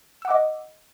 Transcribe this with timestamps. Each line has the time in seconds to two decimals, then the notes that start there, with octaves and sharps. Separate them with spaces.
0.22 E6
0.25 F#5
0.28 D6
0.30 D#5